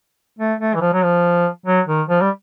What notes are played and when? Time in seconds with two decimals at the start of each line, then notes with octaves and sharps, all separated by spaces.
0.39 A3
0.60 A3
0.75 E3
0.81 F3
0.93 F#3
1.03 F3
1.66 F#3
1.87 D#3
2.08 F3
2.22 G3